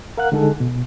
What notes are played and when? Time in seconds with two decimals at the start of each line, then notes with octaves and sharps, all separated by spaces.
0.18 A#4 F5 F#5 F#6
0.32 D3 G#3 D#4 G#4 A4
0.60 B2